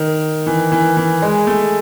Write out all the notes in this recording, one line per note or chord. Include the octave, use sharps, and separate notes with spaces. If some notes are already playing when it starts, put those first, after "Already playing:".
Already playing: D#3
E3
E3
E3
G#3
A3